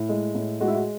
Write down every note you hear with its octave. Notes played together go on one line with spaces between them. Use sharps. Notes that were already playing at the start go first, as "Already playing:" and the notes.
Already playing: A2
G#3
A2
G#3 F#4
E4
F#4